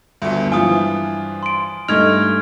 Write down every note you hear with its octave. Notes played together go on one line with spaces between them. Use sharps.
G1 D2 G2
E3 F3 F4 G#5 D#6
C6 D7
G2 A3 D#4 F6 G#6 F7